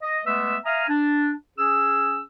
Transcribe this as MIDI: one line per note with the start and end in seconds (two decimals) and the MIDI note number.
0.01 0.21 75
0.25 0.56 56
0.25 0.56 57
0.25 0.56 59
0.25 0.56 71
0.25 0.56 76
0.25 0.56 88
0.66 0.83 76
0.66 0.83 77
0.66 0.83 80
0.66 0.83 82
0.66 0.83 87
0.66 0.83 89
0.88 1.31 62
1.58 2.20 61
1.58 2.20 68
1.58 2.20 88